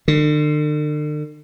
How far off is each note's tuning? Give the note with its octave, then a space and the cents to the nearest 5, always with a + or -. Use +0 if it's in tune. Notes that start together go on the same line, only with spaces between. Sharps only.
D3 +40